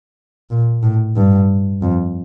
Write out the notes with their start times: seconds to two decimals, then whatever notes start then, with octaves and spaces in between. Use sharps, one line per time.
0.50 A#2
0.83 A2
1.16 G2
1.82 F2